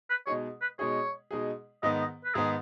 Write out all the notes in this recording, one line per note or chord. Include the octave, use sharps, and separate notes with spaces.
B4
B2 G#3 D#4 G#4 C#5
B4
B2 G#3 D#4 G#4 C#5
B2 G#3 D#4 G#4
G#2 D#3 B3 D#4 D#5
D#5
B4
G#2 D#3 B3 D#4 G#4